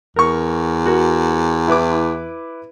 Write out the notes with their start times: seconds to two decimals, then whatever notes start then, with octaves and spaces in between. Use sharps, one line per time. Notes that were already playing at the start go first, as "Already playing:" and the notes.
0.16 E2 A#4 C#6
0.86 F#4 A#4
1.68 E4 B4 D6